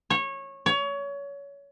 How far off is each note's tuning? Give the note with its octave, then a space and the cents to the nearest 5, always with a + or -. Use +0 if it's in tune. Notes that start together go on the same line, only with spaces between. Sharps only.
C#5 -20
C#5 +25